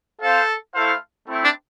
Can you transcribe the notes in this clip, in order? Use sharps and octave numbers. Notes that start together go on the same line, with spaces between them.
C4 F4 A4 C5 F5
A3 E4 A4 C5 F5
A3 C4 E4
D4